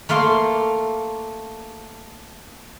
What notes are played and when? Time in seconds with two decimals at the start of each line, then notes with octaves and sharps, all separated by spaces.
0.09 A3 A#3 F5 C6